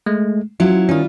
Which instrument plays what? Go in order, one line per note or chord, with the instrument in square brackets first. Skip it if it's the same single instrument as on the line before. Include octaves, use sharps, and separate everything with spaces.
[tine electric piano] G#3 A3
[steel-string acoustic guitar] F#3 C#4 E4 [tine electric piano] F4
[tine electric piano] D#3 C#4 [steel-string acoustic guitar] G3 F4